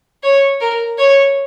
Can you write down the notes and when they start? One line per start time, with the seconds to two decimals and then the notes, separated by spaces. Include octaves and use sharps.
0.23 C#5
0.61 A#4
0.98 C#5